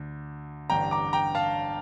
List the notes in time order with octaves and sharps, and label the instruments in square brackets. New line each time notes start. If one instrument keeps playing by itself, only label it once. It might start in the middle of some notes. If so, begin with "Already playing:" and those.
Already playing: [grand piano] D2 D3
A1 G2 D3 G5 A#5
A#5 D6
G5 A#5
F5 A5